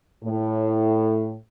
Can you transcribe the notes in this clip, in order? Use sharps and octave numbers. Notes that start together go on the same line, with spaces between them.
A2